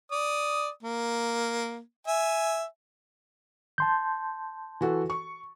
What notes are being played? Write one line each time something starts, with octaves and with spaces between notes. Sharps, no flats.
D5 D#6
A#3
E5 G#5
A5 C6 G6
E3 F#4 A4
C#6